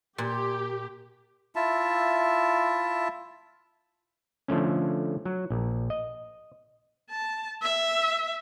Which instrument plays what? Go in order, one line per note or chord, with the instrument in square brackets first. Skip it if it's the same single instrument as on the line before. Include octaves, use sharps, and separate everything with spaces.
[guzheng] A#2 [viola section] G4
[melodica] E4 F4 E5 A5
[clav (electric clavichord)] D3 F3 A3 C#4
F#3
A#1
D#5
[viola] A5
E5